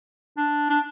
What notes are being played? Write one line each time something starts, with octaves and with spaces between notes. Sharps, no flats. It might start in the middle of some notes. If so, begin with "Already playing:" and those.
D4
D4